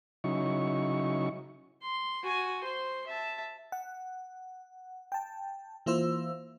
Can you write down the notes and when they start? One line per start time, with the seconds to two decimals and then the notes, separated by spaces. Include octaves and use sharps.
0.24 C#3 F#3 D#4 E4 C#6
1.83 C6
2.23 F#4 G#5
2.64 C5 C6
3.07 E5 A5
3.72 F#5
5.12 G5 A5
5.86 E3 A#3 E4 F4 C5 E6